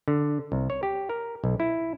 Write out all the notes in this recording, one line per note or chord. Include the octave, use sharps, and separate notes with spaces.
D3
C2
C#5
G4
A#4
B1
E4